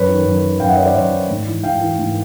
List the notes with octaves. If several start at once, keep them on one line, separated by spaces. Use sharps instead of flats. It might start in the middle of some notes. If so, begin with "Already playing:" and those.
Already playing: F#2 B4 C#5
D#3
F#2
D#3
F#2 F5 G5
E5 F#5
D#3 C#5 D#5
C5 D5
F#2 C#5 D#5
D#3
G#2
E3
G#2 F5 G5
E3
G#2